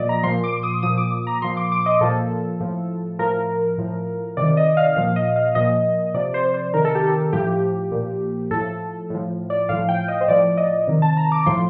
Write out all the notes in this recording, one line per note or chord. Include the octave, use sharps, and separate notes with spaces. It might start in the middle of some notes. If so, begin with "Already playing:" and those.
Already playing: A#2 F3 D5 D#5
A#5
A#2 F3 C6
D6
D#6
A#2 F3 D#6
D6
A#5
A#2 F3 C6
D6
D6
D#5
A#2 F3 A4
A2 F3
A2 F3 A#4
A2 F3
C3 D#3 D5
D#5
F5
A#2 F3 F5
D#5
F5
A#2 F3 D#5
C3 F3 D5
C5
C5
C3 D#3 A#4
A4
G4
A4
A2 F3 G4
A#2 F3
A2 F3 A4
A2 F3
D5
A2 F3 F5
G5
D#5
C5
A2 F3 D5
D#5
C3 D#3
A5
A#5
D6
A2 F3 C6